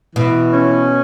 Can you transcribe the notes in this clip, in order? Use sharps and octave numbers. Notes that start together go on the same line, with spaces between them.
B2 E3
C#4